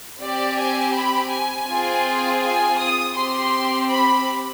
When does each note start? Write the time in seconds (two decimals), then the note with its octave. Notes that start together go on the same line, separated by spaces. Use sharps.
0.20 C4 G4 D5
0.57 G#5
0.93 B5
1.31 G#5
1.67 C4 F4 G#4
2.41 G#5
2.78 D#6
3.15 C4 G4 C6
3.90 B5